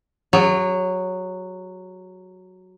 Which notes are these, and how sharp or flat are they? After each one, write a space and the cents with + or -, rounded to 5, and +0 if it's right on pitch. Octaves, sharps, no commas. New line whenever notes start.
F#3 +0 G#4 -35